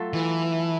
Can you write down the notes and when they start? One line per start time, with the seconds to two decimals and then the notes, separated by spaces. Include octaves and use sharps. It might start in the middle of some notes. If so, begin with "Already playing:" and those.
Already playing: F#3 A3 F4 A4
0.13 E3